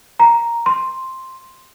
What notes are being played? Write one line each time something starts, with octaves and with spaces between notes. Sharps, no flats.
A#5
C6